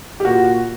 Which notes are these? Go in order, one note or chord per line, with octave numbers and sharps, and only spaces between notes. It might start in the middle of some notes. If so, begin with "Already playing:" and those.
G4
A#2 F#4